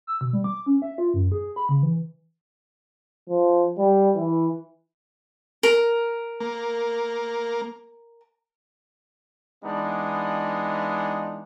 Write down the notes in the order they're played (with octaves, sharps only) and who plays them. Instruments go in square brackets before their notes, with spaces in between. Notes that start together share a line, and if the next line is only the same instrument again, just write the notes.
[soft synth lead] E6
B2
G3
D6
C#4
E5
F4
F#2
G#4
B5
C#3
E3
[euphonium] F3
G3
E3
[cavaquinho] A#4
[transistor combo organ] A#3
[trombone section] E3 G#3 B3 D4 D#4